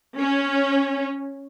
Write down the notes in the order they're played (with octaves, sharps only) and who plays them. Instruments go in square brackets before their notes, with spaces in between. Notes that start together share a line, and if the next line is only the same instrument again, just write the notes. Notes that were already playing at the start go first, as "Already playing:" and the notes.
[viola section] C#4